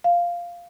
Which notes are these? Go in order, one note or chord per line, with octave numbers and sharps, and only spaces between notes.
F5